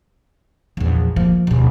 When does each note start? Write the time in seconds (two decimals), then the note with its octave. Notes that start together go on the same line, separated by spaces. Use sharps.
0.77 A#1 E2
1.16 F3 A#3
1.47 D1 B2